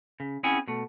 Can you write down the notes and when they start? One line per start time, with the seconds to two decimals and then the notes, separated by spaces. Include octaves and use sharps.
0.20 C#3
0.43 C4 C#4 E4 G#4 F#5 G#5
0.68 B2 A3